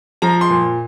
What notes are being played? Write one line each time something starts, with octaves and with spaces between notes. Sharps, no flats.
F3 A#5
C6
A#2